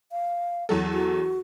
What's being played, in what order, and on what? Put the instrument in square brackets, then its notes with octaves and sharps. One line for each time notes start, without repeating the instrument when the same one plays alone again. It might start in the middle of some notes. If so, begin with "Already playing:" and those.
[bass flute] F5
[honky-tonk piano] E2 F#3 A4
[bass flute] F#4